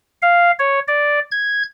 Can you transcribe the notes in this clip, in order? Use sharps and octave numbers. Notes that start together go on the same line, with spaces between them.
F5
C#5
D5
G#6